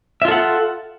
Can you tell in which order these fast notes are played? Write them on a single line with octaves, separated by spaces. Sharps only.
E5 F4 A4 F#5